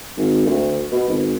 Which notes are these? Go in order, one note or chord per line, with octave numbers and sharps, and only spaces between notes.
G#1
D2
B2
G#1